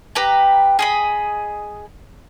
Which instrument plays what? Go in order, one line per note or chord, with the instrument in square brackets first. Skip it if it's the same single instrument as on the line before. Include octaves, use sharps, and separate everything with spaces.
[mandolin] G4 B4 A#5
G#4 D#5 B5